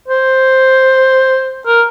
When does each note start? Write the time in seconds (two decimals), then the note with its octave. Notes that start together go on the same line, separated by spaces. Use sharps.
0.08 C5
1.67 A#4